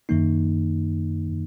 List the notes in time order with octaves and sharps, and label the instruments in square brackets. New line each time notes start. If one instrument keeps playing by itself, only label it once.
[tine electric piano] F#2 D#3 A#3 D#4